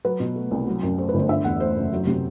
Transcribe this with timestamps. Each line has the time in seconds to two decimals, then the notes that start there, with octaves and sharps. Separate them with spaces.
0.05 F#3 B4
0.20 B2
0.36 A3
0.51 C2
0.67 F#3
0.83 F#2
0.98 A3 C5
1.09 B4
1.14 G1
1.19 C5
1.29 D3 E5
1.44 E2 F#5
1.60 A3 C5
1.76 F#1
1.92 F#3
2.07 C3